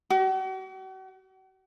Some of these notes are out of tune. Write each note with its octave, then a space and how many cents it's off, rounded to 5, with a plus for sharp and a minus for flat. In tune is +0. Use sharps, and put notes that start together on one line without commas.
F#4 +40